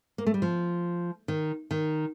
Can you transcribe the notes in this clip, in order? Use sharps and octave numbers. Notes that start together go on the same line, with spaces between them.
A#3
A3
G3
F3
D#3
D#3